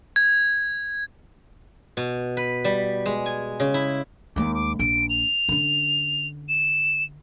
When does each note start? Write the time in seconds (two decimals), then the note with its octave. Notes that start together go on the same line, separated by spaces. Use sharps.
0.16 G#6
1.97 B2
2.37 B4
2.65 G3
3.06 G#3
3.26 G#5
3.60 C#3
3.74 E4
4.36 D#2 G#3 D6
4.54 D6
4.79 A#1 D7
5.10 F7
5.49 D3 C#4
6.49 E7